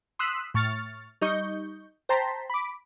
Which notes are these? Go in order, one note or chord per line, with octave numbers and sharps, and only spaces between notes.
C6 D#6 E6 F#6 B6
A2 C#6 F6 A6
G3 D#4 D#5 C#6 G6
C5 G5 A5 A#5 C6 B6
B5 D6